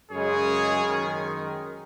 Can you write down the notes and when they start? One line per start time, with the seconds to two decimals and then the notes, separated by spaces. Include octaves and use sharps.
0.11 F#2 C#3 G#3 G#4 C#5
0.86 F#2 D#3 G#3